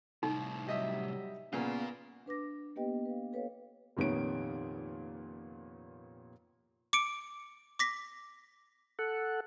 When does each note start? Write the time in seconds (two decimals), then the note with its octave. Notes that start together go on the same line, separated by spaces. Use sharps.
0.23 C2 A2 D#4
0.67 F#3 G3 G4 D#5 E5
1.53 A#2 C#3 B3 F4 A#4
2.26 D4 B4 D6 A#6
2.76 A#3 B3 G4 B4 D#5 G5
3.06 B4 F5
3.33 A4 B4 C#5 F5
3.97 F1 A#2 D#3 B3 C#4 D7
6.93 D6 C#7 D7
7.79 D6 A#6 B6
8.99 A4 F#5